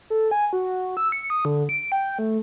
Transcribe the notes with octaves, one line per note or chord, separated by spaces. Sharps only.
A4
G#5
F#4
E6
C#7
D#6
D3
D7
G5
A3